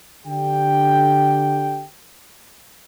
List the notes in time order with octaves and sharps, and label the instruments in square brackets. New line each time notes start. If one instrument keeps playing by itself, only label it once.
[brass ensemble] D3 G4 G5